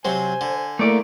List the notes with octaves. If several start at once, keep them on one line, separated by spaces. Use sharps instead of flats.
C3 F#3 C5 G#5
D3
A3 A#3 E4 A#4 D5